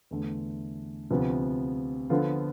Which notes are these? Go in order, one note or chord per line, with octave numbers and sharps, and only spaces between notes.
E2 D3 A3
D2 C3 F3 B3
D3 F3 B3 F4 A4